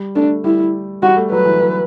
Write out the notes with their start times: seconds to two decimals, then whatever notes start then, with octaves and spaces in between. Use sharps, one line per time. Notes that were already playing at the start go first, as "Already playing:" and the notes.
Already playing: G3
0.15 A3 D4
0.44 G3 E4
1.03 G3 F#4
1.17 A3
1.32 F#3 B4
1.45 E3
1.61 F#3